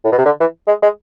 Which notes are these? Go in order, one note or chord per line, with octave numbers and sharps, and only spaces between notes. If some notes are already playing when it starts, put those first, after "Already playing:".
A2
B2
C3
D3
E3
G#3
G#3